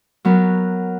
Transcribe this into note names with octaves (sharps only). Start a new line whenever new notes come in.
F#3 B3 A#4